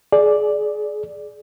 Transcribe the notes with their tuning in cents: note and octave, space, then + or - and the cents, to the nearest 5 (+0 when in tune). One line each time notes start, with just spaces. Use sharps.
G#4 +25 D5 +0